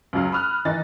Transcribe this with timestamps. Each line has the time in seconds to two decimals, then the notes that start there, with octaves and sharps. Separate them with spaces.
0.13 C#2 F#2 F#3 F5
0.32 B5 D#6 F6 F#6
0.65 D#3 E3 D#4 A6